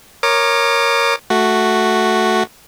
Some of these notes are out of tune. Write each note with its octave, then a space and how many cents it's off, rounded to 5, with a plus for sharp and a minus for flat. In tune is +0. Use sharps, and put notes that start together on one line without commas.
A#4 +0 C#5 +0 D6 +35
A3 +0 F#4 +0